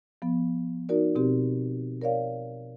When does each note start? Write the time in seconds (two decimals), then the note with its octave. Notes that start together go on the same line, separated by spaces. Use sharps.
0.22 F3 B3
0.89 D#4 F#4 A#4 D5
1.15 B2 C4 G4
2.02 A#4 C#5 D5 F5